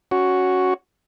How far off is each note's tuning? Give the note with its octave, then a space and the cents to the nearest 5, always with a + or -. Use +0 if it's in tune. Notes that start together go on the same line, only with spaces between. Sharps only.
C#4 +5 F#4 +0